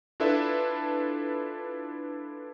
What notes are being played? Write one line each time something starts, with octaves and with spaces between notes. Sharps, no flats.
D4 E4 F4 A4 B4 E5